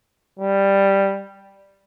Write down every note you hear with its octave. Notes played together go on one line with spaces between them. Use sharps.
G3